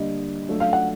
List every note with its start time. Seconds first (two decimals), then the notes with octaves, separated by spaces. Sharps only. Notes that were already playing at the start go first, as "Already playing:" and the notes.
Already playing: D3 G3 A#3 D4 G4 D#5
0.49 F#3 A3 D4 F4 A4
0.60 F5
0.73 F#5